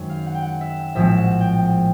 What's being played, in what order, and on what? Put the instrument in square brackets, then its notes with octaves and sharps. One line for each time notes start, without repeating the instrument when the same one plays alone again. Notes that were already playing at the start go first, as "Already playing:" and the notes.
Already playing: [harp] F#2 D#3 G#3 C4
F5
F#5
G5
F#5
E5
A#1 A2 F3 G#3 C4 E5
F#5
G5
F#5
G5